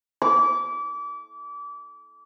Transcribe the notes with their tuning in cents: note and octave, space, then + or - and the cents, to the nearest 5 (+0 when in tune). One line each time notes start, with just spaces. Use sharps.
D6 -30